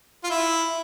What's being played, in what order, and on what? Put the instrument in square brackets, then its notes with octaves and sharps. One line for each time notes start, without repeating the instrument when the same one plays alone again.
[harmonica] F4
E4